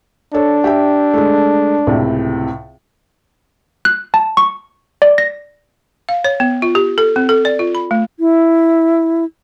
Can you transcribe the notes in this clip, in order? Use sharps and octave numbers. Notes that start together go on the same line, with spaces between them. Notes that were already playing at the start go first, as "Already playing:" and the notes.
D4 A4 C#5
G4 E5 G5
G#3 A3
C#2 A2 C3
F#6
A5
C#6
D5
A#6
F5
C#5
B3
F4
G4
A4
C4
A4
D5
F4
B5
A3
E4